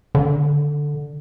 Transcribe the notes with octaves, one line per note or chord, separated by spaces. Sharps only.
D3